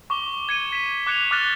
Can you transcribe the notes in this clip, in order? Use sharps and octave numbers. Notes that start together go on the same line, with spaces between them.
C#6 D6 G7
G#6 C#7 D#7
B6 E7
D6 F#6 G#6 C#7 E7 F7
D6 F6 F#6 A6 E7 G7